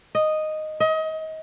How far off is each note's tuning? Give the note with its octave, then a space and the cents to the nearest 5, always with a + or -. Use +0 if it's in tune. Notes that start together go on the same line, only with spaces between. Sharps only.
D#5 -5
D#5 +30